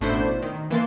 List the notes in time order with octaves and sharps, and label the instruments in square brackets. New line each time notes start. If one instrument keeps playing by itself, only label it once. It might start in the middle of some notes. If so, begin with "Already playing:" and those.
[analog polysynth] A1 B2 A3 D4 E4 C5
D#3
E3 A#3 A5 C6